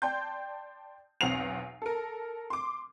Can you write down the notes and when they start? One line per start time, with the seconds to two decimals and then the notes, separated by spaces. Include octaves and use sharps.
0.02 D5 G5 A5 C6 G6
1.21 B1 E2 C4 F#5 C7 F7
1.82 A4 A#4
2.50 C6 D6